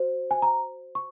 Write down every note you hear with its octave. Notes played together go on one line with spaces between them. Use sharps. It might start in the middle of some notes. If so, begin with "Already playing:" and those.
Already playing: F#4 C5
G#5
A#5
C#6